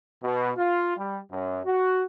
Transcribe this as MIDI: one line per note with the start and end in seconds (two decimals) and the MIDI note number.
0.23 0.51 47
0.57 0.95 65
0.97 1.19 55
1.31 1.60 42
1.65 2.03 66